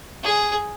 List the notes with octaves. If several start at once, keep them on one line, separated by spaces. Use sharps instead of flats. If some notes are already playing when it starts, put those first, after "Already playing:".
G#4